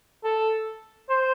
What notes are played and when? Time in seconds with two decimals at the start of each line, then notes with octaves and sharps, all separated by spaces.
0.24 A4
1.09 C5